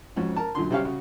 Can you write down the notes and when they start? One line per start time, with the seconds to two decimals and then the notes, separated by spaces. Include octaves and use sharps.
0.16 F2 G#2 C#4 F#4
0.36 A#4 A5
0.55 F#2 A#2 D3 C6
0.71 C3 G3 C#4 G4 F5 C#6
0.85 C#3 F#4